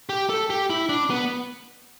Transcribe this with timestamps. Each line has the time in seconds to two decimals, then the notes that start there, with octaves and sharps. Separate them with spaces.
0.09 G4
0.29 A4
0.50 G4
0.70 E4
0.89 D4
1.10 B3